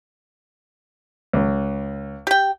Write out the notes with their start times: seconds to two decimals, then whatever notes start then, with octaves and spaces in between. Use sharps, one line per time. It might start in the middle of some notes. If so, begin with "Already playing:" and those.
1.33 C#2
2.27 G4 G5